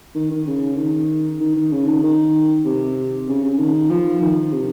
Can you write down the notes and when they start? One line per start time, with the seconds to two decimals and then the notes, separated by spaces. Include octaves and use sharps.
0.15 D#3
0.31 D#3
0.47 C#3
0.77 D#3
1.41 D#3
1.55 D#3
1.72 C#3
1.87 D#3
2.03 D#3
2.65 C3
3.28 C#3
3.43 C#3
3.59 D#3
3.90 F3
4.22 D#3
4.52 C3